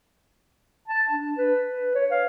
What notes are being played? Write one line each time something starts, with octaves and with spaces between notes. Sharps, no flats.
A5
D4
B4
B4
C#5
F5